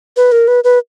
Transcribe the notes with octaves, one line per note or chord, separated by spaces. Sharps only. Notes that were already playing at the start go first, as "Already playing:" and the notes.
B4
A#4
B4
B4